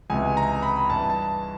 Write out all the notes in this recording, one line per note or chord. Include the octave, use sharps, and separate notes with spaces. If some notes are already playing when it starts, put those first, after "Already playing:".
C#2 C3 E3 G#5
A#5
B5
G2 E3 A5
A5